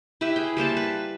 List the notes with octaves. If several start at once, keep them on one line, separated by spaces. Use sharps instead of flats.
E4 G4 B4 E5
G#4 G5
G3 A#3 C5 A5
B4 A5